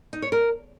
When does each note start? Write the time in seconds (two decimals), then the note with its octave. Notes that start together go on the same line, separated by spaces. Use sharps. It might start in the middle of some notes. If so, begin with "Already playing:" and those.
0.13 D#4
0.22 C#5
0.32 A#4